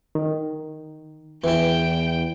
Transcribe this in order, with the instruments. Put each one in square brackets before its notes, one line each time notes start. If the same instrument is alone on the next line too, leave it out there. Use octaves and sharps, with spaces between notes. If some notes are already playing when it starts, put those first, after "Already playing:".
[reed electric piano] D#3
[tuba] E2 [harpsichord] E3 E4 [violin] G5